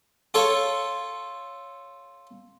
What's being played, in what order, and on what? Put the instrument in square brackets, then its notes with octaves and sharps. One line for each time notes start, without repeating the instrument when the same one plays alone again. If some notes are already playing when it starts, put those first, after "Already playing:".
[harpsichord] F4 A4 C#5